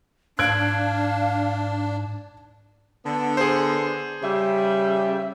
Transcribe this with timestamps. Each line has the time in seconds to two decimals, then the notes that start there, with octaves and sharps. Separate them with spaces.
0.39 G#2 D4 F5 F#6 G#6 D7
3.04 D3 B3
3.37 G#4 C5
4.21 C#3 G3 E5